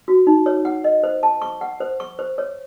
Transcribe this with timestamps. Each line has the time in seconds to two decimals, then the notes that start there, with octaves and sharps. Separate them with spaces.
0.08 F#4
0.27 D#4
0.46 C#5
0.65 F#5
0.84 D#5
1.03 C5
1.23 A5
1.42 C#6
1.61 F#5
1.80 C5
2.00 C#6
2.19 C5
2.38 C#5